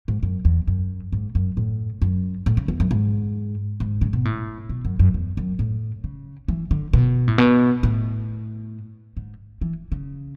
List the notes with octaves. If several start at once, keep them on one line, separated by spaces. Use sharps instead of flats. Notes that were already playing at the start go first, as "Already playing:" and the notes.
G#2
F#2
E2
F#2
G#2
F#2
A2
F#2
A2
C#3
E2
F#2
G#2
G#2
C#3
B2
A2
B2
F#2
F#2
E2
F#2
A2
C#3
E3
D3
B2
A2
B2
A2
G#2
E3
C#3